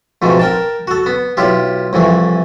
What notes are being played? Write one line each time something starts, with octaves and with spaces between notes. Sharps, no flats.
F2 G#2 B2 A3
A#4 G5 A5
F#4 A4
B3
B1 E4 F4 G4
C2 F2 E3 A3